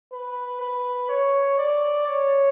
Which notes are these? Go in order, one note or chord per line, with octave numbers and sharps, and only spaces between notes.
B4
B4
C#5
D5
C#5